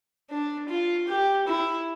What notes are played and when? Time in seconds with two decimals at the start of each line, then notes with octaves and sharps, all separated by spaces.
0.30 D4
0.69 F4
1.08 G4
1.47 E4